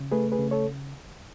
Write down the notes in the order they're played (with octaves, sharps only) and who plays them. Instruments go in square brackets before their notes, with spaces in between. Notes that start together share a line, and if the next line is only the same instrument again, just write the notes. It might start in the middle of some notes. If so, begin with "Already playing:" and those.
Already playing: [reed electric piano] C#3
A3 G#4 B4
G#4 B4
C#3
A4 C#5